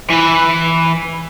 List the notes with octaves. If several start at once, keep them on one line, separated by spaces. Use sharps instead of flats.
E3 B4